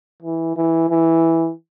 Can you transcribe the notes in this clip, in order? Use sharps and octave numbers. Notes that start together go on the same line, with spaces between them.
E3
E3
E3